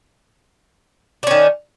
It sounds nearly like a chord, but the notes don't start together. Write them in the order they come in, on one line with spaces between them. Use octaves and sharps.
D4 C#4 D#3